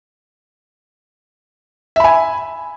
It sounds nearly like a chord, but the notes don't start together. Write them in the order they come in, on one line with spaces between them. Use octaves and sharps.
E5 B5 G#5